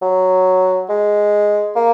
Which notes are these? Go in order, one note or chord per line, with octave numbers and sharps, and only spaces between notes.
F#3
G#3
A#3